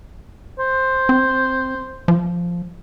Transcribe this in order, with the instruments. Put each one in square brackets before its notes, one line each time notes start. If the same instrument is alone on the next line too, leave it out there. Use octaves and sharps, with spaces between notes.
[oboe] C5
[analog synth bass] C4
F3